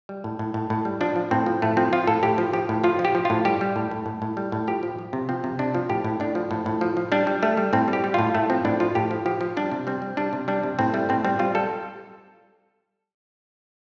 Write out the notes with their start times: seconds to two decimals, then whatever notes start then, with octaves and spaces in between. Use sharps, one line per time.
0.09 G3
0.24 A2
0.39 A2
0.54 A2
0.70 A2
0.85 G3
1.01 F3 D4
1.16 F3
1.31 A2 C4
1.46 F3
1.62 A2 A3
1.77 F3 C4
1.93 F3 F4
2.07 A2 A4
2.23 A2 G4
2.38 F3
2.53 F3 G4
2.69 A2
2.84 F3 F4
2.99 F3
3.05 G4
3.15 F3
3.25 A2 F4
3.45 G3 G4
3.61 G3
3.76 A2
3.91 A2
4.06 A2
4.22 A2
4.37 G3
4.52 A2
4.68 F3 G4
4.83 F3
4.99 F3
5.13 C3
5.29 F3 C4
5.44 C3
5.59 C3 D4
5.74 F3
5.89 A2 G4
6.05 A2
6.20 A2 D4
6.35 F3
6.51 A2
6.66 A2
6.81 F3
6.97 F3
7.12 G3 D4
7.27 G3
7.43 G3 A3
7.57 G3
7.73 A2 C4
7.88 G3
7.93 G4
8.04 G3
8.14 A2 F4
8.35 A2 A3
8.50 F3 C4
8.65 A2 D4
8.80 F3 F4
8.95 A2 G4
9.11 F3
9.26 F3 G4
9.41 F3
9.57 G3 D4
9.72 C3
9.87 G3 C4
10.02 G3
10.17 G3 D4
10.33 C3
10.48 G3 D4
10.63 C3
10.79 A2 C4
10.94 G3 A3
11.09 A2 C4
11.25 G3 C4
11.39 G3 F4
11.55 G3 A4